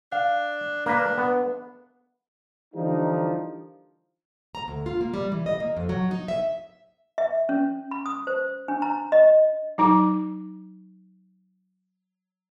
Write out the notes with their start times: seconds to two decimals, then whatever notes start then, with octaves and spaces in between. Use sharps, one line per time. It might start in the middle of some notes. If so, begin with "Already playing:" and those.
0.12 D4 F5
0.86 A#3 D4 B4
1.18 B3
2.74 D3 E3 F3 G3 A#3 D#4
4.55 A#5
4.68 D2
4.86 F4
5.01 A#3
5.14 G3
5.32 E3
5.46 D#5
5.60 A#3
5.77 F2
5.89 F#3
6.11 D#4
6.28 E5
7.18 E5
7.49 C#4
7.91 B5
8.06 D#6
8.27 C5
8.68 D4
8.82 A#5
9.12 D#5
9.78 F#3 D#4 D6